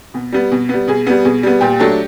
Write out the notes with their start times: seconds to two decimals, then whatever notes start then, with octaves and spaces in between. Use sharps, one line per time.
0.14 B2
0.32 G3 B3
0.52 B2
0.69 G3 B3
0.88 B2 G#4
1.07 G3 B3
1.25 B2 G#4
1.43 G3 B3
1.61 A#2 G4
1.79 F#3 A3 D4